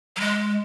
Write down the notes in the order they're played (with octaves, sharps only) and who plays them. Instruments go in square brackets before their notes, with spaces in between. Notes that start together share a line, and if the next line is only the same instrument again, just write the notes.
[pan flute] F#3
G#3